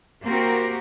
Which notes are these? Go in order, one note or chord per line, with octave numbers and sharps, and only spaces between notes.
A#3 C4 F#4 G4 A#4